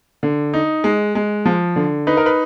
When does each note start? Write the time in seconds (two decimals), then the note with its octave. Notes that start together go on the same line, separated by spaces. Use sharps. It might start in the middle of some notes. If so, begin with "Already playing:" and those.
0.23 D3
0.53 D#4
0.84 G#3
1.15 G#3
1.46 F3
1.76 D3
2.07 D#4 B4
2.17 A#4
2.26 B4